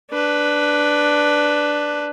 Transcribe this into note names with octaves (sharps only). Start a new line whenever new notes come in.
D4 B4